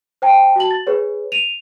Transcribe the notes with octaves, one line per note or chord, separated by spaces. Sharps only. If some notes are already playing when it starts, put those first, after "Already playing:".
C5 G5 A5
F#4 A5 F#7
A6
G#4 B4 C#5
D#7 F7